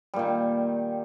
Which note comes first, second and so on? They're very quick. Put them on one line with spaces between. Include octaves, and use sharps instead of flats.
G3 A#2 D#3